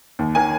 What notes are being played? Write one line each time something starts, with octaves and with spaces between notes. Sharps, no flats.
D#2
D#3 A#3 G#5